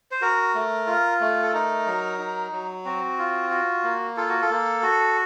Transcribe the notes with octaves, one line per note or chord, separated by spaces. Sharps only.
C5
F#4 A#4
A3
F4
A3
A4
D#4 A#4
F#3
D#4
F#3
C4 F#4
F4
F#4
A#3
F4 A4
F#4
A4
A#3
F#4